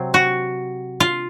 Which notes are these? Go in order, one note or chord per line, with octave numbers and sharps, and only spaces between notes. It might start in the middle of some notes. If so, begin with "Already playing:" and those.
Already playing: C3 F#3 C4
F#4
F4